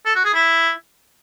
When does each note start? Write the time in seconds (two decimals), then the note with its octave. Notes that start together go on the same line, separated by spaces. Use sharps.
0.06 A4
0.15 F#4
0.25 G#4
0.35 E4